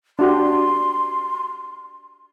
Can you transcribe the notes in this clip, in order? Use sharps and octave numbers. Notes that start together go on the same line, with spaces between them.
D4 F#4 G4 C6